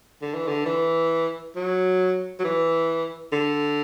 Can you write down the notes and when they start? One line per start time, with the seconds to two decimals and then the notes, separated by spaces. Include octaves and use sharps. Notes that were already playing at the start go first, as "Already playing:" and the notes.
0.22 D3
0.35 E3
0.48 D3
0.66 E3
1.56 F#3
2.39 F#3
2.44 E3
3.32 D3